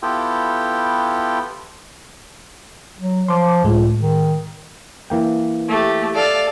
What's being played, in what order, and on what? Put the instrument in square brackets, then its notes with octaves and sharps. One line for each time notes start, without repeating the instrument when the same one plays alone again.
[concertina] B3 E4 F4 G4 A4 G5
[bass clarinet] F#3
[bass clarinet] F3 [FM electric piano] C6 D6
[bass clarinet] C#2 [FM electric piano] A2 G#3
[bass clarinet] D#3
[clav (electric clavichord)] E3 A#3 G5
[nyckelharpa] A3 G4
[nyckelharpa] A4 [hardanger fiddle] D5 F5